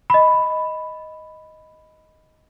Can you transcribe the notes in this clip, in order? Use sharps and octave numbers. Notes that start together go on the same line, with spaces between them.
D#5 B5